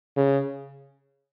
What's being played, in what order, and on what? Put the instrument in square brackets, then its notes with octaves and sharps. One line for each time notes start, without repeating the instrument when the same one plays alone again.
[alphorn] C#3